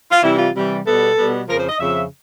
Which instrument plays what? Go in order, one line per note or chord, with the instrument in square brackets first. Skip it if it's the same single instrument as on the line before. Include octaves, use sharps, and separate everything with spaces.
[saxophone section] F4
C3 E3 G3 E4
F4
C3 E3 G3
B2 G3 B3 A4
B2 G3 B3
F2 C#3 F3 A#4
C5
D#5
F2 C#3 F3 E5